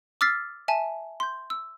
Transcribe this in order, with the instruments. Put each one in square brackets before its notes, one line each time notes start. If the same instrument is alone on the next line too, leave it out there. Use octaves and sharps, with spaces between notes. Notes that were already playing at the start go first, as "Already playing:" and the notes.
[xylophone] D6 E6 F6 A6 B6 C7
E5 G#5 A5
C6 G6
E6